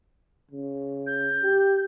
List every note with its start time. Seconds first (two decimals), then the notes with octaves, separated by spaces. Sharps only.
0.51 C#3
1.06 G6
1.43 G4